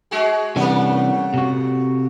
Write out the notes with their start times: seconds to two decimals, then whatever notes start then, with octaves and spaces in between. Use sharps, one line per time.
0.11 G#3 F#4 G#4
0.56 C3 E3 G3 A3 A#3 C#4 D4 F#5
1.34 C3 F#4